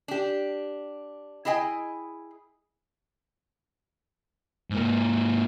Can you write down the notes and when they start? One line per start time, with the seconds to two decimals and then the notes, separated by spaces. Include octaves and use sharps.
0.08 D4 G4
1.45 E4 G#4 D#5 G5 G#5
4.70 G#2 A#3